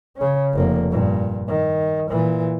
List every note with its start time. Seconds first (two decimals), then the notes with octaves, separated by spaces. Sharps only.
0.17 C#3 C#4
0.53 F1 A#3
0.91 G2 A#2
1.47 D#3
2.08 A#2 E3